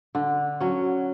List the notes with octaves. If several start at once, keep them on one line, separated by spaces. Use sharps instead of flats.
D3
F#3 C#4